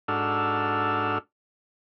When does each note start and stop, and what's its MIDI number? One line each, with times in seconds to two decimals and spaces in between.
0.08 1.18 44
0.08 1.18 62
0.08 1.18 66
0.08 1.18 69
0.08 1.18 88
0.08 1.18 89